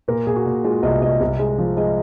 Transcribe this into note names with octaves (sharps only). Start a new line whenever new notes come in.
A#2 A#4
A#2 G#4
F#4
A#2
G#3 F4
C2 D#5
C2 D#5
C2
G#3
F3
G#3 D#5